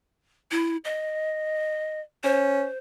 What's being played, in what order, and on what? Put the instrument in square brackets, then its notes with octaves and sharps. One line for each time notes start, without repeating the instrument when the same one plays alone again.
[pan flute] E4
D#5
[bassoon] C#4 [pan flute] C5